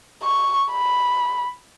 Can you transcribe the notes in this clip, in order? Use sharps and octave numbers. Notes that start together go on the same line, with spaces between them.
C#6
B5